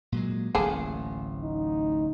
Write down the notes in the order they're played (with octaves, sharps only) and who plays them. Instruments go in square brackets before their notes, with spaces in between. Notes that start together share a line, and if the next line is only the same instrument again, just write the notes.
[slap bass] A#2 F#3 G#3
[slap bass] D1 A1 [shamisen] A#3 G#4 A4
[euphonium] D#4